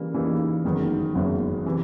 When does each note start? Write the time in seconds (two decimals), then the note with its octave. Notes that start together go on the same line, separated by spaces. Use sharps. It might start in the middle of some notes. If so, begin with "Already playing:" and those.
Already playing: C#3 E3 G3 A#3
0.14 C#3 E3 G3 A#3 D#4
0.64 F#1 F#2 D#3 G#3 B3
1.15 F#1 F#2 D#3 G#3 B3
1.66 C3 E3